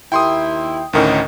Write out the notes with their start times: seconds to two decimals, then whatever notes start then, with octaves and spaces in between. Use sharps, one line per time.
0.12 D#2 E4 G5 C6 D#6
0.93 D2 A2 D#3 C#4